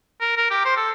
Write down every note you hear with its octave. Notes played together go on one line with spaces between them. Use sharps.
A#4
A#4
G4
C5
A4